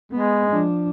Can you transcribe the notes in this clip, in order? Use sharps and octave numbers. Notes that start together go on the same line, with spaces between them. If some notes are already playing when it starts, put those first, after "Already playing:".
G#3 B3
F3 D4